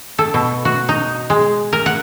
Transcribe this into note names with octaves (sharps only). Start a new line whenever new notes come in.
A4
B2
F#4
D#4
G#3
A#4
F#5